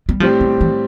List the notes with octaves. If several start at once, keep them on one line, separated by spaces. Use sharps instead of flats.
G3
A2 F3 G3 C4 G4
D3
E3